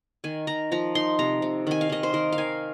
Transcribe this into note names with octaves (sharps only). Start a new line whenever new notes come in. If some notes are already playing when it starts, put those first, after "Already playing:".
D#3 G#5
D#3 A#5
F3 A#5
D#4 C6
C3 A#5
C3
D#3 G#5
F5
D#3 D#5
C5
D#3 A#4
F5
D#3 G#5